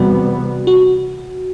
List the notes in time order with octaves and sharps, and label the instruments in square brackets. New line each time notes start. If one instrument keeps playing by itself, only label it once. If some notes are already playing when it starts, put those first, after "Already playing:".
Already playing: [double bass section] E2 C3 G3 B3 [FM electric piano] F#4
[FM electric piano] F#4